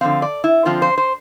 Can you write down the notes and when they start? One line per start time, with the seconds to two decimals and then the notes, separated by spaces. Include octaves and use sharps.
0.01 D3 F3 C4 F5
0.22 D5
0.44 E4
0.65 D3 F3 C4 F4
0.82 C5
0.98 C5